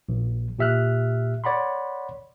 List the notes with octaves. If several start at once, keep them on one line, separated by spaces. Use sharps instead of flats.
A#1
A#2 G4 E5 F6 F#6
C#5 D5 F#5 B5 C6